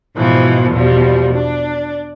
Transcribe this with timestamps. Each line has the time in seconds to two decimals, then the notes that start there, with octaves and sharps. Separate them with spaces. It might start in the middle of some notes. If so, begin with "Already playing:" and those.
0.16 G#2 B2 E3 F3
0.71 E2 B2 F3 G3
1.34 D4